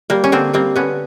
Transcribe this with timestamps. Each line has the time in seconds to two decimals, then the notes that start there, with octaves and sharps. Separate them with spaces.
0.10 G3 A#3
0.24 C#4
0.32 D3 A#3 C4
0.54 G3 A#3 C4
0.76 D3 B3 C#4